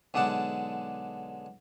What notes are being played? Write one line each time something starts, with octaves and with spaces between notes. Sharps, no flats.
B1 D3 G#3 D5 F#5 A5